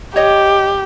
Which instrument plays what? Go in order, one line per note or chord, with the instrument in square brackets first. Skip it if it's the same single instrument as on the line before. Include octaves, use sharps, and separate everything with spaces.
[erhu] G4 [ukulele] C#5 D#5